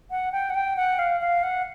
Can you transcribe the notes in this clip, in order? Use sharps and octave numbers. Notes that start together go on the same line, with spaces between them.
F#5
G5
F#5
G5
F#5
F5
F5
F#5